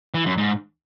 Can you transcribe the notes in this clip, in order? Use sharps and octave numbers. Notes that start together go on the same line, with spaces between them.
E3
F#2
G#2